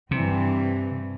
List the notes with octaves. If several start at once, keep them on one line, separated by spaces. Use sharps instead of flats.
G2 C3 E3 C4